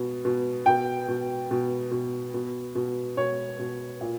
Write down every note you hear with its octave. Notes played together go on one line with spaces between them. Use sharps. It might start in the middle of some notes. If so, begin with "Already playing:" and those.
Already playing: B2
B2
B2 G5
B2
B2
B2
B2
B2
B2 C#5
B2
A#2